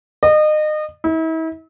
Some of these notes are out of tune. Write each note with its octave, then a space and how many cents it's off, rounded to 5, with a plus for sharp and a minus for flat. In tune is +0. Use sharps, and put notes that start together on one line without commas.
D#5 -30
E4 -40